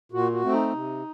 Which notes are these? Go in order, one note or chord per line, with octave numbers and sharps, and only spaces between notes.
A#2 F#4
F#4
A3 C4
D#4
C3